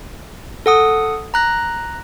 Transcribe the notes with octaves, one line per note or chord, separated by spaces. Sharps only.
A4 F#5 D#6
A#5 F#6 A#6